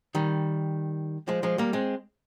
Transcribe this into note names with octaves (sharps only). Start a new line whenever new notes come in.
D#3 G3
F3 G#3
F3 G#3
G3 A#3
G#3 C4